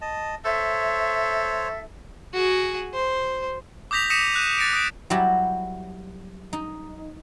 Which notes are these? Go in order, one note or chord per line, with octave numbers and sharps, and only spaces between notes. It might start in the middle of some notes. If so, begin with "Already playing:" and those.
D#5 A5
A4 C5 C#5 E5
F#4 G#4
C5
D6 D#6 G6 A#6 B6 F7
D#6 A#6 B6 C#7 D#7 E7
F#6 D#7
A6 A#6 C#7 D7
D#6 D7
F#3 G3 E4 F#4 G4
D#4